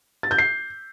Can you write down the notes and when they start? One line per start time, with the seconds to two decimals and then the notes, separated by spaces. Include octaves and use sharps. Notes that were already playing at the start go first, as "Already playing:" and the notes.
0.23 A6
0.31 G6
0.38 C7